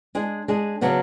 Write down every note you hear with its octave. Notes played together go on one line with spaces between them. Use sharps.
G#3 D4 G#4
G#3 D4 G#4
C#3 F#3 B3 D4